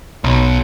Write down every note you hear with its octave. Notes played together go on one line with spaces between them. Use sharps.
B1